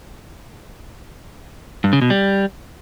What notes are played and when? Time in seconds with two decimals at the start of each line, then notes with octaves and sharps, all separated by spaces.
1.84 G2
1.93 C#3
2.02 B2
2.10 G3